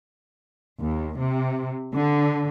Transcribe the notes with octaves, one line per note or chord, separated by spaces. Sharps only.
D#2
C3
D3